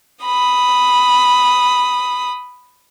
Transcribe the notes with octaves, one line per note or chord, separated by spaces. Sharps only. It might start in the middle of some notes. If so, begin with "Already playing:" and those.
B5 D#6